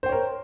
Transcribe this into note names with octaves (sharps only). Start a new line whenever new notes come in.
A#4 C5 C#5 G5